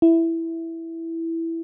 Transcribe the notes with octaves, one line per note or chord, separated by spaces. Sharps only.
E4